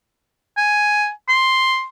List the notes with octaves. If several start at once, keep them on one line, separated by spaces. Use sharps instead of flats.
G#5
C6